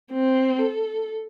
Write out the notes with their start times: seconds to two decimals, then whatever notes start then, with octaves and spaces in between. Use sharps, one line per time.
0.12 C4
0.59 A4